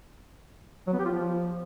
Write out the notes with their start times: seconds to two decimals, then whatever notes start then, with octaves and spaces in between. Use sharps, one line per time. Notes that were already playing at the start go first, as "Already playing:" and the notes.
0.87 F#3
0.93 B3
0.99 G4
1.05 F4
1.11 F3